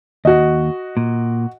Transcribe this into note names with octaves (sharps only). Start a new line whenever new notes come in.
D#2 F#4 D#5
A#2